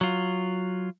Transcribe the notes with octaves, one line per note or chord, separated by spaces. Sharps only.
F#3 F4